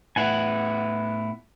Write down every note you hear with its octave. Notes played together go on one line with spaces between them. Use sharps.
A2 B3 E4 F#5 G#5